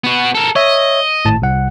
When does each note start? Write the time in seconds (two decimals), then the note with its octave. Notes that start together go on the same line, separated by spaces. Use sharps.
0.04 B3 F#4
0.35 A4 A#4
0.56 C#5 D#5 E5
1.25 G#1 A2 A5
1.42 C2 F#5